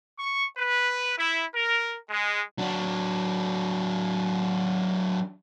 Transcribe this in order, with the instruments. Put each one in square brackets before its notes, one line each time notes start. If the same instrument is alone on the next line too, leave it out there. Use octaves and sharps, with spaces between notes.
[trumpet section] C#6
B4
E4
A#4
G#3
[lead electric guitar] F#3 D4